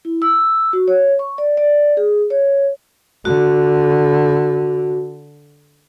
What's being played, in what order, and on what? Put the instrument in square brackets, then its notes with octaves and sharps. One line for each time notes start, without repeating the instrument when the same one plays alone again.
[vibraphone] E4
E6
F#4
C#5
C#6
D5
D5
G#4
C#5
[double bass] D3 [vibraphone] F#4